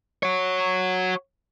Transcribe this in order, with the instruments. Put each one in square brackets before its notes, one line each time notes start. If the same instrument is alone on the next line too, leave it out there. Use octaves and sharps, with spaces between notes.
[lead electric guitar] F#4 C#5